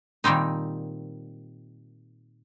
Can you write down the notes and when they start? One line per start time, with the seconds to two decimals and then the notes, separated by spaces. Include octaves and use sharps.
0.24 A#2 D#3 G3 C4 D#4